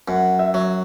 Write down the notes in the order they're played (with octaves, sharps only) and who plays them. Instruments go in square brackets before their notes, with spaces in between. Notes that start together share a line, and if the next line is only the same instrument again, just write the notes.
[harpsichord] F#2 [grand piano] F#5
[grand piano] E5
[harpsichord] F#3